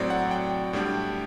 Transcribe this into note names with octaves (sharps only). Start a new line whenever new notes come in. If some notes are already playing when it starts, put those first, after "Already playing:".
Already playing: A2 F#3 C4 D5
F#5
G5
A2 G3 D4 G5